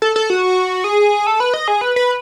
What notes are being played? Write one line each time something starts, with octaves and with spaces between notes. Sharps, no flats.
A4
A4
F#4
G#4
A4
B4
D#5
G#4
B4
B4